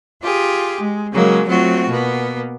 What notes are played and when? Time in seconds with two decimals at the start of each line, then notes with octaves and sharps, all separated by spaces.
0.21 F4 G4 G#4
0.80 G#3
1.12 C#3 F#3 G#3 A#3
1.47 F#3 A3 C4 F4 F#4
1.87 B2 A#3 B3